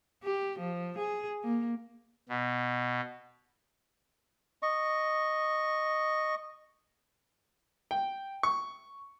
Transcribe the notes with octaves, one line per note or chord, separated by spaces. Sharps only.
G4
F3
G#4
A#3
B2
D#5 C#6
G5
C#6